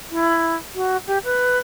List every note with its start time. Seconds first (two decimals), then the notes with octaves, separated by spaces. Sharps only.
0.11 E4
0.75 F#4
1.07 G4
1.24 B4